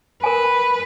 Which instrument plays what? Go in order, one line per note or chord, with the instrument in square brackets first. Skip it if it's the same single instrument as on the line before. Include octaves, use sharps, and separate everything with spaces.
[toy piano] A#4 G#5 [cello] B4